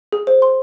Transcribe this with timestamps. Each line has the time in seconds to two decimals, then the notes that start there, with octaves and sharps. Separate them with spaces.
0.12 G#4
0.27 C5
0.42 C6